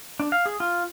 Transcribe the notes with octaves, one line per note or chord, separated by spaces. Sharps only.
D4
F5
G#4
F4